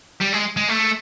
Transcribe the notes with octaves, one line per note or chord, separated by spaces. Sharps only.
G3
G#3
G#3
A3